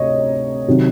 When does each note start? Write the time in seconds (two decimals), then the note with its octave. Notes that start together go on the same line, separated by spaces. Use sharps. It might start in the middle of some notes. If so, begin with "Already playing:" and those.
Already playing: D2 C3 C#5 D#5
0.68 C3 D#3 F#3